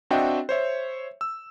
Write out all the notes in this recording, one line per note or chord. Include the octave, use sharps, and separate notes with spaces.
C4 D4 F#4 D#5 E5 G5
C5 C#5 E5
E6